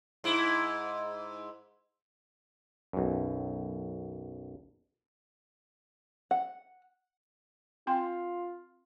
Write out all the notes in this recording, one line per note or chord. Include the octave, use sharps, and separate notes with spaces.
G#2 E4
B1 F#2
F#5
C4 F4 G5 C6